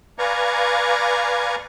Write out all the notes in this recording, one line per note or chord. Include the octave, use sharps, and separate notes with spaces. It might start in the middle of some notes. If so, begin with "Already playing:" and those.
B4 D5 F5 G#5 A#5 C#6